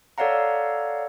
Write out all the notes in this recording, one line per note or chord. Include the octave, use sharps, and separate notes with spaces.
A4 C#5 D5 F5 F#5 A#5